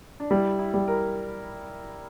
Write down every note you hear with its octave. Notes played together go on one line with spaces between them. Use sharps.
D4
G3 E4
E4
G3
A#4